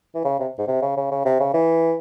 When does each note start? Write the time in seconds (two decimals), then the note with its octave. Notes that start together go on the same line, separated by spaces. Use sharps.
0.15 E3
0.25 C#3
0.39 C3
0.58 G#2
0.67 C3
0.82 C#3
0.97 C#3
1.11 C#3
1.25 C3
1.40 C#3
1.53 E3